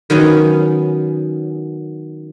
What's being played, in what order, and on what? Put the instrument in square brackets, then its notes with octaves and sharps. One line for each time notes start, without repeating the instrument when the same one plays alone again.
[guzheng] D#3 F#3 B3 C#4